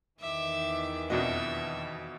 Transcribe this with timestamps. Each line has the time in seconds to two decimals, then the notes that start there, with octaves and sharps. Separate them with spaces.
0.20 E2 D#3 E3 E5 D6
1.10 F2 B2 D4 F#4 D#5 E5